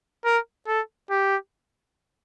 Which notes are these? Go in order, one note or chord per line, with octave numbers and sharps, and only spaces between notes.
A#4
A4
G4